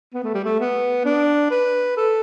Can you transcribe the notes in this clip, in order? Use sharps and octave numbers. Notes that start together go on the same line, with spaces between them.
B3
A3
G3
A3
B3
D4
B4
A4